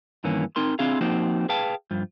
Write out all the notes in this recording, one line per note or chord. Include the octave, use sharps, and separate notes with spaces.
G2 D#3 E3 A#3 C#4
C4 D#4 A#4 C6
C4 D4 E4 F4 G#4 F5
F3 A#3 C4 D#4 F#4
G#4 B4 F5 G5 A5
G2 F3